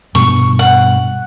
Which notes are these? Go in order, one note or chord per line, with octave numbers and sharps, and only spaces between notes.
G2 B2 G3 C#6
F#5